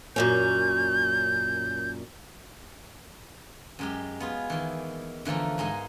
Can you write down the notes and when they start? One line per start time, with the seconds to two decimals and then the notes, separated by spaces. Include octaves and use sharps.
0.16 F#2 A#2 C#4 G6
3.79 F#2 G#3 G4
4.20 B3 F4 G#4
4.50 D#3 E3
5.25 D3 E3 F3 A3 A#4
5.58 G#2 G#3 D#4 D#5 G#5